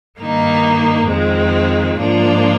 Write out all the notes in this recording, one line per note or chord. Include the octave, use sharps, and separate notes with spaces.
G2 D#3 A#3 D#4
F2 D#3 G#3 C4
G#2 F3 A#3 D4 F4